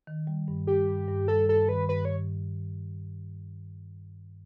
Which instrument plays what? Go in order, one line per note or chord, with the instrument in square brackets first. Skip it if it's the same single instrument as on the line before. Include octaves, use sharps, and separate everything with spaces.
[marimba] D#3
G3
G2
[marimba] G3 [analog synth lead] G4
[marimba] G2
G2
[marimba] G3 [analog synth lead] A4
[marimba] G2 [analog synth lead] A4
[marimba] D#3 [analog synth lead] B4
[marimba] G2 [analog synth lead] B4
[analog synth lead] C#5